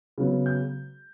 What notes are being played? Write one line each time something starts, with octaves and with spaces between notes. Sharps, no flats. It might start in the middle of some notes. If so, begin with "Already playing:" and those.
C#3 F#3 B3
G6